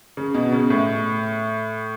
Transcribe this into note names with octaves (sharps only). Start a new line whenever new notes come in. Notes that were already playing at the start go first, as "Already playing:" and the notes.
C#3
B2
C#3
A2